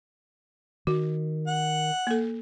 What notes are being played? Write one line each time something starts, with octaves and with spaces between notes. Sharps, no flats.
D#3 F#4
F#5
A#3 A4